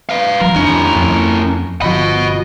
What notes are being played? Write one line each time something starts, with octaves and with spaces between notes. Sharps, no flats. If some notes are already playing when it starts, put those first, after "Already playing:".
B4 F5
E3 F#3 A#4
F2 D#3 C#4 D4 E4
F2
G1 F3 F#4 D#5 B5